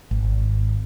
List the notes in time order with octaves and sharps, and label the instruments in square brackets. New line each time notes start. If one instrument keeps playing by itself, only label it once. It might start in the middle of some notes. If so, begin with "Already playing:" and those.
[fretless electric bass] G#1